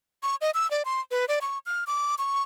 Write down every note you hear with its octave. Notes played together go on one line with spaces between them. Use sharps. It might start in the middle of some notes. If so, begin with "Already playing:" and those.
C#6
D#5
E6
D5
C6
B4
D5
C#6
F6
D6
C#6